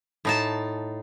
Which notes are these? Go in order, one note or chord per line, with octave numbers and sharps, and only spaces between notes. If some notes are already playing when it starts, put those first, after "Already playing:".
A2 D#4 A5